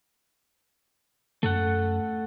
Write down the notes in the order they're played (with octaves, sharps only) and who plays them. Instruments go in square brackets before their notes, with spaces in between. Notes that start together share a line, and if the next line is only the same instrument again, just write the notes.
[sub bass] F#2 [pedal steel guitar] A3 A4 F#5